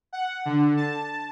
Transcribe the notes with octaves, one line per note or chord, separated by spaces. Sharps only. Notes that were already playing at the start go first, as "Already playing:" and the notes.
F#5
D3
A5